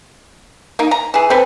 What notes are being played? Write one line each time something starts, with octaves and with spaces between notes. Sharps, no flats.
A#3 D#4
A#5
E3 G#4
C4 A4 B4